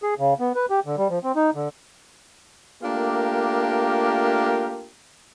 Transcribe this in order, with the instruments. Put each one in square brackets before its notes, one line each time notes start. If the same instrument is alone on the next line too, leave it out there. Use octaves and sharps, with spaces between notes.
[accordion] G#4
C#3
B3
B4
G4
D3
G3
F3
C4
D#4
D3
[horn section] A3 A#3 D4 F4 G4 A#4